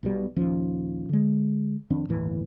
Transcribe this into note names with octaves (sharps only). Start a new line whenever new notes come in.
B1 B2 E3 G3
A#1 D#2 F3 C#4
D3 G#3
F2 D#3 C4 D4
G1 D#2 A2 E3